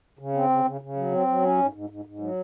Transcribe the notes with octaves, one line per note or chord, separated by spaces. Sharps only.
C#3
C4
C#3
C#3
C#3
F#3
C4
F#3
C#4
G#2
G#2
G#2
G#2
F#3